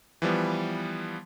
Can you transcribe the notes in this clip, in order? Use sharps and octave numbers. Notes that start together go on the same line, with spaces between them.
E3 F3 G3 B3